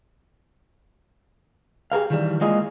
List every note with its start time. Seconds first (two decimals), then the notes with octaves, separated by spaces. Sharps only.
1.92 G4 G#4 A#4 F5
2.10 D#3 E3 G3
2.41 G#3 A#3 F4 G#4 D#5